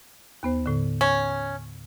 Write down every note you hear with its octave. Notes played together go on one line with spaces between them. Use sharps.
D#2 B3 C5
A2 D3
C#4